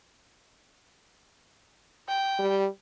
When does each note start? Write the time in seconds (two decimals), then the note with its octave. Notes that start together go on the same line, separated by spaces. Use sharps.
2.09 G5
2.39 G3